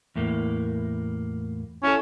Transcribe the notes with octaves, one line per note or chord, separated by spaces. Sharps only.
E2 A2 A#3
C#4 E4 A4